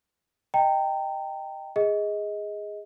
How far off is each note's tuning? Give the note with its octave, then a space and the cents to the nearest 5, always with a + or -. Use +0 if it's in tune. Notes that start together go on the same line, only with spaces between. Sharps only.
D#5 +0 G5 +0 A#5 -30
G#4 -10 D#5 +20